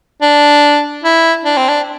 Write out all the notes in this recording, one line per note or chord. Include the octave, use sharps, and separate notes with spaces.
D4
E4
D4
C4
D4